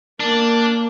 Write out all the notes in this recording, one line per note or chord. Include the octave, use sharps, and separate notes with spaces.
A#3 D4